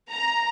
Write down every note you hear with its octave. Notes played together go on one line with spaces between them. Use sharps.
A#5